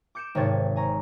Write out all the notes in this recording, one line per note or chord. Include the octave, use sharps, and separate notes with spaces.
D6 G6 C#7 D7 E7
G#1 G#2 C3 C#5 A6
G#5 A#5 C#6